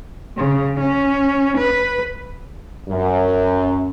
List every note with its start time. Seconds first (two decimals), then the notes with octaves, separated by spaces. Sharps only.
0.37 C#3
0.80 C#4
1.58 B4
2.89 F#2